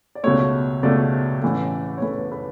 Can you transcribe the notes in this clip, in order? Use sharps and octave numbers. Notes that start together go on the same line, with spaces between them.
D5
C#2 B2 A3 C#5
C#2 B2 A3 D5
A1 A2 E3 A3
C#5
A1 A2 E3 A3 B4
B4